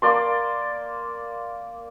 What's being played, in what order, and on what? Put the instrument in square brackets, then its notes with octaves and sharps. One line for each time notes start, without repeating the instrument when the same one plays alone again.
[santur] A#3 D5 C6